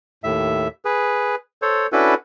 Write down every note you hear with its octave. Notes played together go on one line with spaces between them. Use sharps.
D#2 A2 E5
G#4 B4
A4 C5 C#5
C#4 D4 E4 F#4 A4 B4